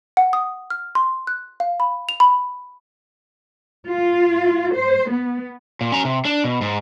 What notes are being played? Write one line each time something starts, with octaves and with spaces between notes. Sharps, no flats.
F#5
D#6
F6
C6
F#6
F5
B5
F7
B5
F4
C5
B3
A#2
C#4 A#5
C3
D4
B2
G#2